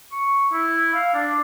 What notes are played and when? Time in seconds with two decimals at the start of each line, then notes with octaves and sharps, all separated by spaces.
0.12 C#6
0.53 E4
0.94 F5
1.14 D4